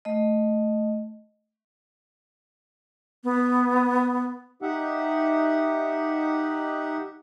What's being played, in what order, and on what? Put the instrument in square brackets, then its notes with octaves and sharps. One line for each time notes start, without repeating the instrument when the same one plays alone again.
[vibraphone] A3 D#5
[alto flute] B3
[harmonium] D#4 G4 E5 F#5